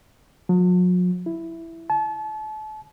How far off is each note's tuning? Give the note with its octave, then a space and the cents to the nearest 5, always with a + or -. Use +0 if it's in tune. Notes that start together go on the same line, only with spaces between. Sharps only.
F#3 -45
E4 +5
A5 -35